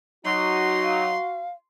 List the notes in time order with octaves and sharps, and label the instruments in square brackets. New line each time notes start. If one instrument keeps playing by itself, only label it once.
[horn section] F#3 D#4 [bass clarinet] F#4 [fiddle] C6
[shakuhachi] F5